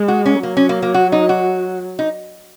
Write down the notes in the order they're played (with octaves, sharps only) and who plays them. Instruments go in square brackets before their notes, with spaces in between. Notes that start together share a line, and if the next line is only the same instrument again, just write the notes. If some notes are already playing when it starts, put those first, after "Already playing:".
Already playing: [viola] G#3
[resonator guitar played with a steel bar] F#4
C#4
[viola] F#3 [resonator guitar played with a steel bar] A#3
[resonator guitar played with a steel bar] C#4
A#3
A#3
F#4
D#4
F#4
D#4